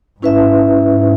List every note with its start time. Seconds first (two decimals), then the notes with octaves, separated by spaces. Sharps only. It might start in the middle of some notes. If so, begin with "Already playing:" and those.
0.21 G#2 C#4 E4 B4 E5